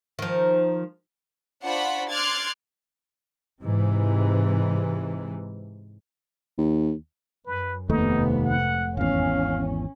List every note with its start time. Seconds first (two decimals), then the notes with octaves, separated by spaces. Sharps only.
0.19 D#3 F3
1.64 D4 F4 C5 F#5 B5 C#6
2.10 C6 D6 F6 F#6 G#6 A6
3.62 G#2 C3 E3
6.58 D#2
7.46 F#2 B4
7.90 F1 D#2 G#2 C3 A3 B3 D#4
8.45 F#5
8.97 G#1 E2 C#4 F5